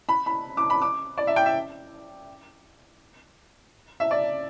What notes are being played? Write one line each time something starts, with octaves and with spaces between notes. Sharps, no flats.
B5
B5
D6
B5
D6
D5
E5
G5
E5
E5
D5